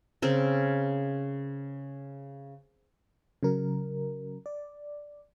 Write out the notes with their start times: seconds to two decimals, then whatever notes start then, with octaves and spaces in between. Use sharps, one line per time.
0.22 C#3 C4 A#4
3.43 C#3 F#3 A#4
4.46 D5